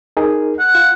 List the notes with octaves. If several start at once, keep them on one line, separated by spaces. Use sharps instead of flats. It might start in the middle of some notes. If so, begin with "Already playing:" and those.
D#4 G#4 A#4
F#5
F4